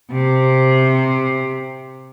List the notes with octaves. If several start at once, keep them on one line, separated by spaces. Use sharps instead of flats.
C3